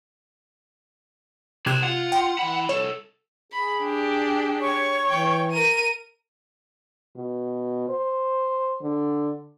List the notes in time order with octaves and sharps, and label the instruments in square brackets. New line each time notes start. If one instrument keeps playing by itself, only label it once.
[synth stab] C3 F#6 G#6 [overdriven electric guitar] C5 D5
[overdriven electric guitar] F4 [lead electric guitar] F#5
[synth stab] G5 C6
[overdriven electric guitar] E3 B5
[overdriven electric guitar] C2 A4 [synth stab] C#5
[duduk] G#4 [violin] B5
[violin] D4 G4
[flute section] C#5 C#6
[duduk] E3 [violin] G5
[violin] A#4 D#7
[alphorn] B2
C5
D3